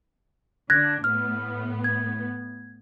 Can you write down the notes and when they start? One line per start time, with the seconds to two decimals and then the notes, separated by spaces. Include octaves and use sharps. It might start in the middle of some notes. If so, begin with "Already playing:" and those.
0.70 D3 D4 F#6 G#6 A#6
1.04 A2 B3 F6
1.84 G#6